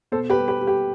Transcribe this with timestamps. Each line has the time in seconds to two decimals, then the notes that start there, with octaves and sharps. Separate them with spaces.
0.12 B2 A4 C5
0.30 G4 B4
0.37 G3
0.48 G4 B4
0.61 G3
0.67 G4